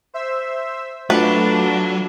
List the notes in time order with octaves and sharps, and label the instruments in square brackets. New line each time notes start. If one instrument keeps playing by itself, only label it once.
[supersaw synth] C5 E5 E6
[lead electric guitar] F#3 [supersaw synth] A3 F4 F#4 [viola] D4 [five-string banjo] B4